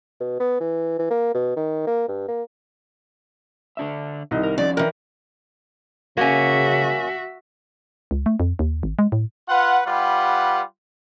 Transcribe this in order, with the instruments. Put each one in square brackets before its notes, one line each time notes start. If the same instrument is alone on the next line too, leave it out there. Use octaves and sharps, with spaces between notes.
[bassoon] B2
B3
E3
E3
A#3
B2
D#3
A#3
G2
A#3
[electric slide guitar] D3 D4 E5
[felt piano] C2 D#3 D#5
[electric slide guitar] A#4
[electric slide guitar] F3 C#4 [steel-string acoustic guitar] D5
[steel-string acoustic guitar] D#3 E3 [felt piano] A#4
[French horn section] C#3 [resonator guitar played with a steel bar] A#3 C#4 [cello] F#4 E5
[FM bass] C#2
A3
F2
D#2
G#1
G#3
A2
[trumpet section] F4 B4 F#5
G3 F4 G4 B4 F#5